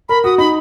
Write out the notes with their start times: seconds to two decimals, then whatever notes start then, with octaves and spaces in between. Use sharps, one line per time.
0.09 A#4 B5
0.24 F#4 D#6
0.38 D#4 B5